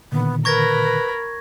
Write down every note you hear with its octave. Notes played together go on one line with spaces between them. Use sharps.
A#2 D3 D#3 B3
A#4 B4 B5 C#6 G#6 A#6